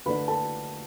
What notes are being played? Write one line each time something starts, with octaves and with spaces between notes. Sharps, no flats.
D3 A3 D4 B4 B5
A4 A5